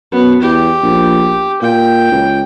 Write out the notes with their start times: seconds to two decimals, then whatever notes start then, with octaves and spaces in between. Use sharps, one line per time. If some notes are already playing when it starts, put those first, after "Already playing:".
0.12 F#2 B3
0.42 E2 G4
0.83 A#1
1.62 A#2 G5
2.12 C#2